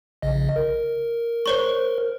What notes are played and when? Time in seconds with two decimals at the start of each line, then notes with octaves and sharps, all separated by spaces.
0.22 A#1 C#3 D#5
0.56 A#4
1.46 C5 C#5 C#6